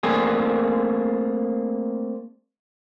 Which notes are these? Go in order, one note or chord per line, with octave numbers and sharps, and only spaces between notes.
A3 A#3 C4 D4 G#4